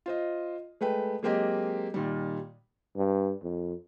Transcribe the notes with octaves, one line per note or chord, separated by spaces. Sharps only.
F4 C5 D#5
G#3 A3 B4 G5
F#3 G#3 A#3 C4 G4 D#5
A#2 D#3 G3
G2
F2